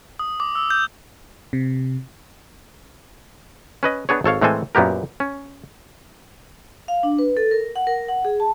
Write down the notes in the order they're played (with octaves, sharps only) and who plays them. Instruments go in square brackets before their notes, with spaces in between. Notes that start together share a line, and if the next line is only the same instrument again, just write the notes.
[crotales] D#6
D6
E6
G6
[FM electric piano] C3
[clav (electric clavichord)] C#4 B4 D#5
B3 D4 G#4 C#5
G#1 A4 C#5 F5
A2 E3 G#3 C4 A4 G#5
F#2 A#2 B3 G4 A#4
C#4
[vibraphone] F5
D4
B4
A4
A#4
F#5
A#4
F#5
G#4
A5